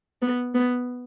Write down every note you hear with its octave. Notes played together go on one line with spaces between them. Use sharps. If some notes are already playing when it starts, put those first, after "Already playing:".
B3
B3